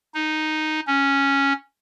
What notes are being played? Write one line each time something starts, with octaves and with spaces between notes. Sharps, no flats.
D#4
C#4